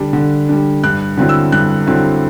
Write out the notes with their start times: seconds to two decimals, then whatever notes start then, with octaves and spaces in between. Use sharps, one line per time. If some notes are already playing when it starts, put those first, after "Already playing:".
Already playing: D3 G3 D4
0.13 D3
0.49 G3 D4
0.84 G2 F#6
1.17 D3 F#3 C4 E4
1.29 E6
1.52 G2 F#6
1.87 D3 F#3 C4 E4